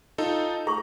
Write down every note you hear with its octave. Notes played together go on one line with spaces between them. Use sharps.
D#4 F4 A4
G#4 A#5 C#6